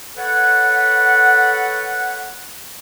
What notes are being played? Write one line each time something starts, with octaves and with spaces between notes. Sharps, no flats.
A4 B4 C#5 F#5